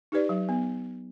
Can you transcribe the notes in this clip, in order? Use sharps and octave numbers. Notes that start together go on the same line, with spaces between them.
D#4 G4 B4 D5
F#3
B3